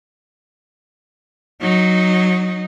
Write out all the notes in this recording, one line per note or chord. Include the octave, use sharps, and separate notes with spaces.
F#3 D#4